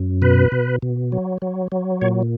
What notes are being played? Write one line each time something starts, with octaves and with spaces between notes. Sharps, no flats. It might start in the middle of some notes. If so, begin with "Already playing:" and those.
Already playing: F#2
B2 B4
B2
B2
F#3
F#3
F#3
A#2 C#5